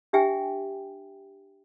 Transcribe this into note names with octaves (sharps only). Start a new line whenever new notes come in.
D4 G4 E5 G5 G#5